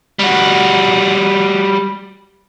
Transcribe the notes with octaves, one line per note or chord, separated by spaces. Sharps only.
G3 F#4